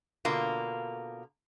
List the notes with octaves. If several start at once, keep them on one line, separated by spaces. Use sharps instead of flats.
B2 D3 A#3 F4